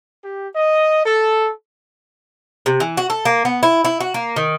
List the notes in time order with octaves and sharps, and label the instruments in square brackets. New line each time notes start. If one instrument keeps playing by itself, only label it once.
[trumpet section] G4
D#5
A4
[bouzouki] C3
E3
F#4
A4
A#3
B3
E4
E4
F#4
A#3
D#3